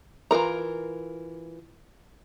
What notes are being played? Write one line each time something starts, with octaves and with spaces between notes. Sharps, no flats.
E3 F4 A#4 A#5